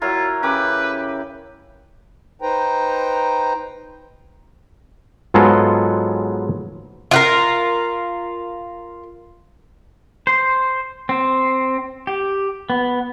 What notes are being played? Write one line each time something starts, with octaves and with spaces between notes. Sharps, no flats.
F#3 E4 F4 A#4
C#3 G4 B4 D6
D#4 B4 C5 G5 A#5
G#2 F#3 G#3 B3 F4 A4
F4 F#4 A#4
C5
C4
G4
B3